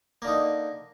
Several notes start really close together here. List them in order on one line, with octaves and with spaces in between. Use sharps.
A#3 D3 D#4